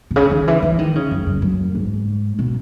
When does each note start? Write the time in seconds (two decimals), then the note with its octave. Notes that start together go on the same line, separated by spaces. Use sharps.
0.11 B2
0.16 C#3
0.31 D#3
0.47 E3
0.62 E3
0.79 D#3
0.95 C#3
1.11 F#2
1.26 F#2
1.42 F#2
1.75 G#2
2.39 B2